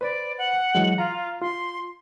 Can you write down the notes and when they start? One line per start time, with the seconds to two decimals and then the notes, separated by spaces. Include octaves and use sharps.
0.01 B4 C5 D5 B5
0.38 F#5
0.75 E3 F#3 G#3
0.98 F4 A#5
1.42 F4 C6